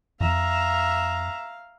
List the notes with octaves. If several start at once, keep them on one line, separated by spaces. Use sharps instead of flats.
F2 E5 F5 A#5